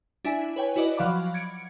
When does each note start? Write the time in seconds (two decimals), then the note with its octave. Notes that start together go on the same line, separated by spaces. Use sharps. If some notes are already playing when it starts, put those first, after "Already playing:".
0.25 D4 E4 E5 G#5
0.56 B4 C#5 G5 G#5
0.76 E4 F#4 B4 D5 D#5
0.97 F3 F#3 F5 F#5 B5 D6
1.34 G#6 C#7 D7